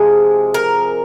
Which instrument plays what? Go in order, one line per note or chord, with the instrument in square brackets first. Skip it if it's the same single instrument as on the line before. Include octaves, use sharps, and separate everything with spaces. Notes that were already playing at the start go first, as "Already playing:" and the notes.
Already playing: [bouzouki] C3 F3 G#3 G#4
A#4